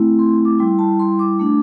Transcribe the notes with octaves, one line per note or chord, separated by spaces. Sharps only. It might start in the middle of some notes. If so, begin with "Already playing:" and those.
Already playing: A3 C4 E4
C6
D6
G3 E4 C6
A5
C6
D6
A3 D4 D6